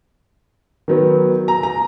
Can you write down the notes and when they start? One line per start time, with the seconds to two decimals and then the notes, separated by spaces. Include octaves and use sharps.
0.88 D#3 F#3 B3
1.48 A#5
1.63 A#5